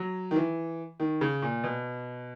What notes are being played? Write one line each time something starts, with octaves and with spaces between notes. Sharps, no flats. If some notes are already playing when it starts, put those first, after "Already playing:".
Already playing: F#3
D#3
E3
D#3
C#3
A#2
B2